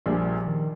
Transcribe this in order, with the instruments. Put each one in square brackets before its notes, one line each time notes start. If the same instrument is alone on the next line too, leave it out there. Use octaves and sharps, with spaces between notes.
[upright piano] A#1 A#2 G3 D4 G#4 [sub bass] F3
[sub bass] D#3